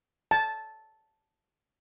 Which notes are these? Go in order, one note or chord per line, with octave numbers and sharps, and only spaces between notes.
A5